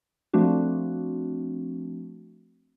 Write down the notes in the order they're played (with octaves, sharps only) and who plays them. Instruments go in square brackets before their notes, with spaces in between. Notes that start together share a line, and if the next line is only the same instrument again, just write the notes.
[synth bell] F3 A3 C4 D4 F#4